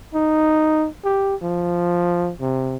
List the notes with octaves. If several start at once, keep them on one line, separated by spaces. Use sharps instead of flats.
D#4
G4
F3
C3